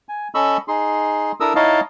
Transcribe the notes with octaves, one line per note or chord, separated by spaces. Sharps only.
G#5
C#4 A4 D#5 B5 C#6 E6
D#4 G#4 C6
D4 E4 A4 A#4 D#6 E6
D#4 E4 C#5 D#5 F5 A5